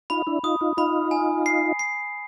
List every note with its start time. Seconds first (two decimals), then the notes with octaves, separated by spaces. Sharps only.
0.10 D#4 F4 B5
0.27 D4 E4
0.43 D#4 F4 D#6
0.61 D#4 F4
0.77 D#4 F4 B5
1.11 G#5
1.46 C7
1.79 C7